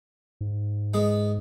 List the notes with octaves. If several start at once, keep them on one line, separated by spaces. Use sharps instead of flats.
G#2
G#3 B3